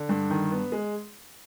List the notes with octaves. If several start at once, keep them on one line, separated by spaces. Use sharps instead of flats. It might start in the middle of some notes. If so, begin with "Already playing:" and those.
Already playing: D3
G2
D#3
B3
G#3